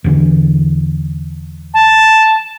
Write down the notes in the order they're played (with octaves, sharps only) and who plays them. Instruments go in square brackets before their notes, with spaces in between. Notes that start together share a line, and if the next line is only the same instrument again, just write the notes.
[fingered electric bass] E2 D3 E3
[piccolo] A5